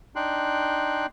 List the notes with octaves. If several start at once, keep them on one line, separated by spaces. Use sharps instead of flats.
D4 D#4 G5 C6 F#6